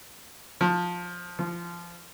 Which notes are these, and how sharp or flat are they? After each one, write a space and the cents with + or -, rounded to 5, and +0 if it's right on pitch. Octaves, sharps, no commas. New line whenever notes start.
F3 +15
F3 -20